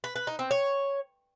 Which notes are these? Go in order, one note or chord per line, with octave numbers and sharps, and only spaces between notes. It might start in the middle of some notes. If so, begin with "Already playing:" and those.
B4
B4
D#4
C4
C#5